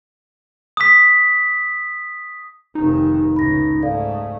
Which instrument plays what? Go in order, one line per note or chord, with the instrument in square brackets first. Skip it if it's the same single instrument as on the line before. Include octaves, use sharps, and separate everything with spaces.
[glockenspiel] D#6 B6
[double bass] F1 D#3 [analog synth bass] D#4
[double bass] C#2 A2 [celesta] B5 A#6
[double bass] G#2 A3 [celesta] A4 D5 F5